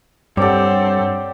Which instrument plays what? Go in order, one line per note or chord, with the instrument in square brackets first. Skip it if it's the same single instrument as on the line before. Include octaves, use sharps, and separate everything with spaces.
[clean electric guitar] G2 [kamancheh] C4 A4 [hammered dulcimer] G4 D5 [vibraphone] C#5 F#5